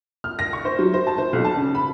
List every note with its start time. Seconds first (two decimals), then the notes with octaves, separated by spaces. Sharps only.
0.24 F6
0.39 A#6
0.53 C#6
0.65 C5
0.79 F#3
0.94 C5
1.07 A5
1.18 C5
1.33 B1
1.45 A5
1.57 C#3
1.75 B5